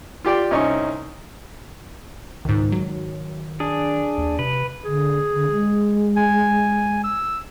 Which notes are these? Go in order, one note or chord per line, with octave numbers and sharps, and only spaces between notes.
F4 G4 D5 G5
C2 C#4 D#4 G#5 C#6
C#2 G#2 D#3
F#3
D4 G#4
D#2
C3 B4
D3 G#4
D3
G#3
G#5
E6